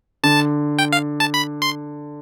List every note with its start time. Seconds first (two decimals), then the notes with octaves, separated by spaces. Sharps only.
0.23 D3 A5
0.79 G5
0.93 F5
1.20 A5
1.34 B5
1.62 C6